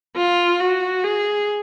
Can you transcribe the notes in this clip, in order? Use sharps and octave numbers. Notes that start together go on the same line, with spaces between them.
F4
F#4
G#4